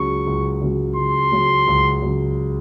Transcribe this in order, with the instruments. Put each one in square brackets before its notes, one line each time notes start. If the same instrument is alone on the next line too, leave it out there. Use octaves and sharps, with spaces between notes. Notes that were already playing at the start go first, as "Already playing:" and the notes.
Already playing: [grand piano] C#2 C#3 F#3 [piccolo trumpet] C#6
[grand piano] C#2
C#3 F#3
[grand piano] C#2 [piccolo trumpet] C6
[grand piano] C#3 F#3
C#2
C#3 F#3